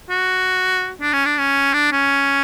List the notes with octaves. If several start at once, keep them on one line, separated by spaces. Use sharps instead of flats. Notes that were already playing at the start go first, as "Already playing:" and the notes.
F#4
D4
C#4
D4
C#4
D4
C#4